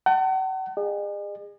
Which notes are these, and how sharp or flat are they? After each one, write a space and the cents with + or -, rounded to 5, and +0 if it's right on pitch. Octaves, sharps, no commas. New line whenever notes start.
F#5 +40 A5 +30
G#4 -30 D#5 -45